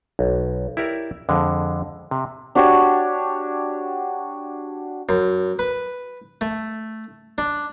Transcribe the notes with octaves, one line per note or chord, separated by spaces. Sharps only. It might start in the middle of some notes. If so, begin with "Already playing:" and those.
B1
E4 G4 A#4 C#5 D5
F2 D3 G#3
C3
D4 F#4 G4 C#5
F#2
B4
A3
D4